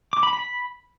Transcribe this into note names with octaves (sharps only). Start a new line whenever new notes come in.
D6
B5
B5